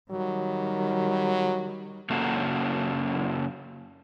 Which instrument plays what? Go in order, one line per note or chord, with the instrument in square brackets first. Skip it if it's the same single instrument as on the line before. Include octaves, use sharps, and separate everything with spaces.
[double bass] D#3 G3 [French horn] F#3
[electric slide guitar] F#2 C#3 A#3 F#4 A4 A#5